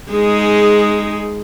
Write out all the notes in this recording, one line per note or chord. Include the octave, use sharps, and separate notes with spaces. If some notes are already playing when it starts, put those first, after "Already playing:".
G#3 D#4 G#4